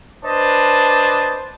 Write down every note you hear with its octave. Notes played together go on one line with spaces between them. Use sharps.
D4 B4 C5 D#5 A5